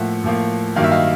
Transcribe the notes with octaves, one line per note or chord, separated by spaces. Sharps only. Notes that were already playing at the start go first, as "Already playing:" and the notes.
Already playing: A2 F3 A#3 E5 F#5
A2 F3 A#3
G2 D#3 F#3 A#3 F5
E5
D#5 F5